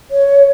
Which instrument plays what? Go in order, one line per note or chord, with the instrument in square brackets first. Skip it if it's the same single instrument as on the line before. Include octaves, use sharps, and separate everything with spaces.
[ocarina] C#5